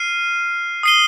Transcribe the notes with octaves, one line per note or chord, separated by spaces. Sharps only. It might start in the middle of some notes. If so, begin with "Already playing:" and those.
Already playing: F6 C7 D#7
D#6 C7 D#7 G7